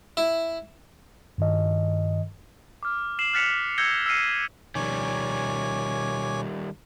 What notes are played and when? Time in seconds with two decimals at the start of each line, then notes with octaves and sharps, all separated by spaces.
0.17 E4
1.38 G2 D#3 D#5
2.83 D6 F6
3.19 C7 E7 F#7
3.33 F6 F#6 A6 B6 C#7 F7
3.78 E6 G6 G#6 A#6 C#7 G7
4.06 E6 F6 A#6 C7 C#7 D#7
4.75 B2 D#3 F3 G3 C#4 C#5 G#5 D6